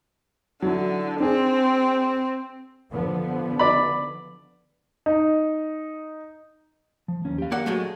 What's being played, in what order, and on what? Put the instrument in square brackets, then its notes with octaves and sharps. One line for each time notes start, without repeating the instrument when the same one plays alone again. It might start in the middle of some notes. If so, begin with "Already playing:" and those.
[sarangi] D3 [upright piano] F#3 E4
[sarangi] C4 [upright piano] D4 G#4
[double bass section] D3 F3 B3
[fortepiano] D5 B5
[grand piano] D#4
[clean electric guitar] F3
D#2 C#4
G4 F5
[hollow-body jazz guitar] A#3 D5 F#5
F#3 G#3 A3